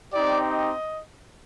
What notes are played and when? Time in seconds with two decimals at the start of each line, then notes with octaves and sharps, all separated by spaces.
0.13 C4 D#4 G4 D5
0.50 D#5